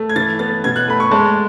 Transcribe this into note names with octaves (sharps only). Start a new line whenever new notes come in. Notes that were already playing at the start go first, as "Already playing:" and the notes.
Already playing: A3
G#6
E3 A6
B3 A6
B2 G#6
F#6
A3 B5
C#6
G#3 A5